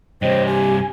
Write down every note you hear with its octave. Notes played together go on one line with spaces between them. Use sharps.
G2 C3 C5 C#5 D#5 G5
G4 G#5